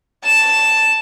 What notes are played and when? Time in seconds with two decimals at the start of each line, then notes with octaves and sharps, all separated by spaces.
0.25 A5 E7